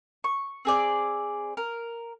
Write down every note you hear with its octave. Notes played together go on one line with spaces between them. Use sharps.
C#6
C4 G#4 D5
A#4